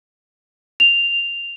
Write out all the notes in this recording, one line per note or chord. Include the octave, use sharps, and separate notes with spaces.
F7